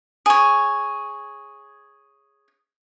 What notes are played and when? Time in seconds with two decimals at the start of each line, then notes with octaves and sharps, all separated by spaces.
0.26 G#4 C#5